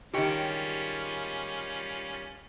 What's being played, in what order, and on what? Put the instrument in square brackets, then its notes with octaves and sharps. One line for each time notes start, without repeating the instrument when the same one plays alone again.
[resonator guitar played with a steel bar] D#3 G#3 [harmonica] G3 C#4 F4 [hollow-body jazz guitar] G4 C#5